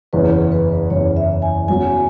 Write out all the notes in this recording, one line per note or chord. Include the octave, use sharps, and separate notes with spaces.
F#1 E2 E3 C#4 B4
G#4
B4
F#1 E2 E3 C#4 C#5
E5
G#5
F#1 F#2 F#3 B3 F#4 G#5